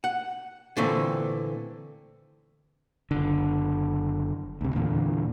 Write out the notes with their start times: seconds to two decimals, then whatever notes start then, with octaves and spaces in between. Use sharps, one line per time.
0.04 F#5
0.77 A#2 D3 E3 A3 C4
3.11 F#1 D3
4.61 D2 C3
4.75 E2 A#2 D3